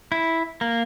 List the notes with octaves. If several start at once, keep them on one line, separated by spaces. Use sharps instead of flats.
E4
A#3